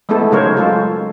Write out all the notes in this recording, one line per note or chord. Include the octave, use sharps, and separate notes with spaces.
G#3 A3 B3 E4 A4
C#3 F#3 D#4 A#4 C5 C#5
G#3 F4 A4